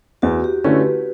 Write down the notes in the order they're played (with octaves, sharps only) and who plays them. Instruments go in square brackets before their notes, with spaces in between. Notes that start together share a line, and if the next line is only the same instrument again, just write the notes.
[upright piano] E2 [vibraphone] F#4
[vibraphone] G4
[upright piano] D3 A3 C#4 E4 [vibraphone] B4